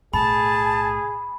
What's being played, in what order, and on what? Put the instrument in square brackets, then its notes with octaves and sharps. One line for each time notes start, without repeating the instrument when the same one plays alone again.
[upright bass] B1 A2 [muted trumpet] G#4 [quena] A5 [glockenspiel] B5